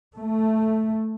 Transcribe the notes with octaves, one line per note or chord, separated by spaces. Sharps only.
A3